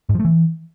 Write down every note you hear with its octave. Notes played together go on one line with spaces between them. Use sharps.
G#2
F3
A3
E3